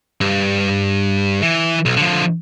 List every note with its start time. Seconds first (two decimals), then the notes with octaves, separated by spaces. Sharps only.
0.21 G2
1.42 E3
1.86 B1
1.97 D3 F3